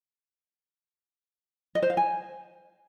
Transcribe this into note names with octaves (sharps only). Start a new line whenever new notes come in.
D#5
C5
F5
G#5